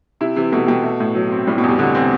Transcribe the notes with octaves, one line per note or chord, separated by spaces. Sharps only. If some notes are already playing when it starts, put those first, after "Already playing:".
C3 E4
C3 E3
B2 A3
B2 G4
A3
A2
F#3
C4
A2 G3
B2
E2 C3
B2 D3
C4